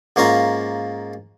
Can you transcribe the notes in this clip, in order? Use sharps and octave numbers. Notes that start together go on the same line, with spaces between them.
G#2 A#3 C#4 F4 A#5